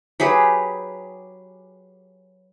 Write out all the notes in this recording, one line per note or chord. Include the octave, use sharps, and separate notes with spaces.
F#3 G4 G#4 B4